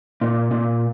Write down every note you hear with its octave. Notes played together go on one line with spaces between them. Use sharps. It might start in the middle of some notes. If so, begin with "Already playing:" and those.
A#2
A#2